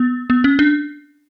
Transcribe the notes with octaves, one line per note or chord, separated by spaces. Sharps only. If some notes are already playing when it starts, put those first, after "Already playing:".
Already playing: B3
B3
C#4
D4